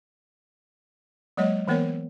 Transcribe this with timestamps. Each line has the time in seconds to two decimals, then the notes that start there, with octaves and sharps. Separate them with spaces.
1.37 F#3 G#3 A#3 C#5 D#5
1.68 E3 A#3 B3 A#4 C#5